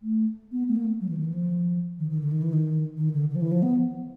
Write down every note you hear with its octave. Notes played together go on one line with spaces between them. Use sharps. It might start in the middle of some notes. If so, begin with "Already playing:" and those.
A3
B3
A3
A#3
A3
F#3
E3
D#3
E3
F3
D#3
D#3
D3
D#3
E3
D#3
D#3
D3
D3
F3
E3
F3
B3